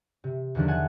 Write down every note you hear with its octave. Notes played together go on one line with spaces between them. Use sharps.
C3
E2 D3 D#3 F3 F#3 D4
F#5 G#5 A5 F#6 G#6